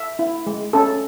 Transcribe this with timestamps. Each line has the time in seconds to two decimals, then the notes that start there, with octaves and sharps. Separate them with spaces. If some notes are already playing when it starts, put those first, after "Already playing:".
Already playing: E5
0.19 E4
0.47 G#3
0.73 C#4 A4